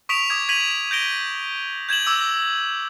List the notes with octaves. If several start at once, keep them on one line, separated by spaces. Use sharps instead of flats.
C#6 D#6 B6 D7 E7 F7
D6 D#6 G#6
G#6 B6 D#7 F7 F#7
G6 A#6 D7 G7
G6 G#6 E7 F#7
D6 E6